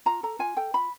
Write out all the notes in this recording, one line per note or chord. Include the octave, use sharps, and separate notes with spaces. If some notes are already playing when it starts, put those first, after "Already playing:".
F4 A#5
A4 A#5
F4 G#5
A4 G5
F4 B5